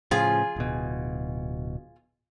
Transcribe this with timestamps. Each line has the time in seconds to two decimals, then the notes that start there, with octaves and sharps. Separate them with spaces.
0.11 A2 C#3 F3 F4 G#4 G#5
0.56 D1 B2